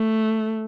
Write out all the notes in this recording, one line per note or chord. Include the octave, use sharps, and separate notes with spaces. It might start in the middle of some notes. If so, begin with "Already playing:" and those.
Already playing: A3